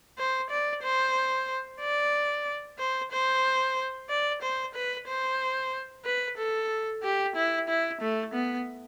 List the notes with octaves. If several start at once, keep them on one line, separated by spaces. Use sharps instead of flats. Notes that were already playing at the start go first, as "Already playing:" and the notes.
C5
D5
C5
D5
C5
C5
D5
C5
B4
C5
B4
A4
G4
E4
E4
A3
B3